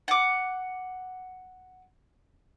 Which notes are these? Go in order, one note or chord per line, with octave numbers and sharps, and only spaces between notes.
F#5 D6